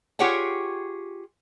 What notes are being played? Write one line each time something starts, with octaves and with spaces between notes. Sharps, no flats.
F4 G4 G#4 C#5 F#5 G5